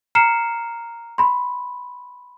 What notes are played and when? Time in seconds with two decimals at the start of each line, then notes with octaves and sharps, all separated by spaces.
0.15 A#5 F6 C7 C#7 E7
1.18 B5 C6